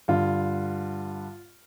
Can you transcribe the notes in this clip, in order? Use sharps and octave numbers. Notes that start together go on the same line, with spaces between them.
G2 D3 F4